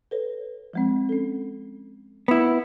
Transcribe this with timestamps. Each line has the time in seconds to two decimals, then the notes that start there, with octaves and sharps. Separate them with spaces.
0.11 A4 B4 C#5
0.73 F3 G#3 C4
1.09 C#4 A4
2.28 B3 E4